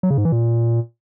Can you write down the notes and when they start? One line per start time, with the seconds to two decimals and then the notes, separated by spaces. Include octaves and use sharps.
0.03 F#3
0.10 C#3
0.18 G#2
0.25 E3
0.32 A#2